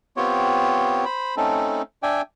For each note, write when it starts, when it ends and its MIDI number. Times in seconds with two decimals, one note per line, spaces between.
0.17 1.05 59
0.17 1.05 60
0.17 1.05 65
0.17 1.05 67
0.17 1.05 73
1.05 1.35 72
1.05 1.35 83
1.37 1.82 57
1.37 1.82 60
1.37 1.82 61
1.37 1.82 63
1.37 1.82 69
2.03 2.22 62
2.03 2.22 74
2.03 2.22 76
2.03 2.22 79
2.03 2.22 80